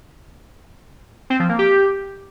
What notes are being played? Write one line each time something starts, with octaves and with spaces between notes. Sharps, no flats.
C4
F3
A#3
G4